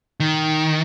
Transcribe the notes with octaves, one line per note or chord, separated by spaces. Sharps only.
D#3